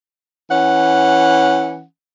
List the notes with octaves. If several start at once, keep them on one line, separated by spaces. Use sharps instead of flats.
E3 C#4 F#5